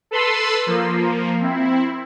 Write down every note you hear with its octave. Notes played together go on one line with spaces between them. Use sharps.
A4 B4 A5 B5 C6 E6
F3 A#3
C4 E4